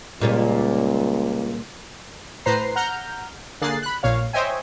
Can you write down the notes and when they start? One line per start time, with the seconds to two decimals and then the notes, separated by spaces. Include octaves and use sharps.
0.21 C#2 A#2 G3 C#4
2.46 A2 B4 C5 A#5 C7
2.76 F#5 A#5 F6 G6
3.61 D3 A#3 G#4 F#6 A6 C7
3.82 B5 F#6
4.03 A#1 A#2 C#5 F5
4.33 C5 C#5 D#5 E5 G5 G#5